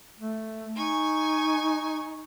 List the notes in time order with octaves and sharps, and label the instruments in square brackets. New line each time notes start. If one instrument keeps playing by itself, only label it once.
[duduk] A3
[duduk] D#4 [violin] G#5 C#6